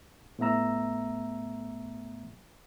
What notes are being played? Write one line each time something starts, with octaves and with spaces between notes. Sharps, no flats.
A2 A3 B3 E5 A#5 E6